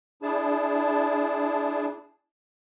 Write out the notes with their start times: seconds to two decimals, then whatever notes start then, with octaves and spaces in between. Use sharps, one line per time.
0.22 D4 E4 G#4 A5